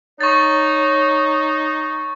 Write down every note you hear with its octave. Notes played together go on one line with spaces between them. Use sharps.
D#4 C#5 C#6 A6